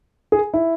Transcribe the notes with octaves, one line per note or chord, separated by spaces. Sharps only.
G#4
E4